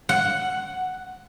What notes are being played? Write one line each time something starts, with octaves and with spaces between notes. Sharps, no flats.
F#5